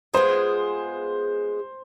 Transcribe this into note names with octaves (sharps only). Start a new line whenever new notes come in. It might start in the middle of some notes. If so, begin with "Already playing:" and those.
G#3 B3 F4 G#4 C5